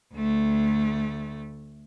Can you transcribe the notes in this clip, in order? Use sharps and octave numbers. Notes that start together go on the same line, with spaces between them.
D2 A3